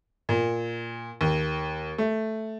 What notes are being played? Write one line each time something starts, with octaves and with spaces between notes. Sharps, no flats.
A#2
D#2
A3